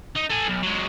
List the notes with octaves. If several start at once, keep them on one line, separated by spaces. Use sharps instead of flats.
D#4
A4 G#5
B1
F#3 G#3